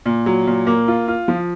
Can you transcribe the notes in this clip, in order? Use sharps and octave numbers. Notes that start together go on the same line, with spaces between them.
A#2
F#3
A#2
A#3
F4
F4
F3